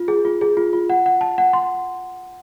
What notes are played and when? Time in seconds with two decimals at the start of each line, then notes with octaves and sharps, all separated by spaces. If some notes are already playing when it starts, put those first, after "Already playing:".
Already playing: F4
0.08 G#4
0.25 F4
0.41 G#4
0.57 F4
0.73 F4
0.89 F#5
1.06 F#5
1.21 A5
1.38 F#5
1.53 C6